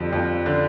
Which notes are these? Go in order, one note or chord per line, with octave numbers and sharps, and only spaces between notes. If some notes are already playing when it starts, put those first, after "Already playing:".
Already playing: F2 D3 G3
F2
D3